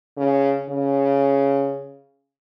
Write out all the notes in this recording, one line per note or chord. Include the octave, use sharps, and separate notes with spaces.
C#3
C#3